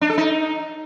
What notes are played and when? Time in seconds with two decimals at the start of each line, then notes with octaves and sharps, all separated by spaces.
0.01 D4
0.10 A4
0.18 D#4